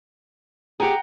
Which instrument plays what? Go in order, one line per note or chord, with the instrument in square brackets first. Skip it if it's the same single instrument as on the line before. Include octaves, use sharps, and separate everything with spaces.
[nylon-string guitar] G4 G#4 [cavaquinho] F#5 G5 A#5